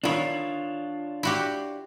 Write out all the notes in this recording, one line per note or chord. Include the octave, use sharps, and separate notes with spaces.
D#3 D4 E4 F4 C#5
E4 F#4 G4